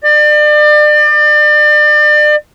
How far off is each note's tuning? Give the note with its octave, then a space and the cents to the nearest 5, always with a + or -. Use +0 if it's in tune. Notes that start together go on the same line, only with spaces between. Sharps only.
D5 +35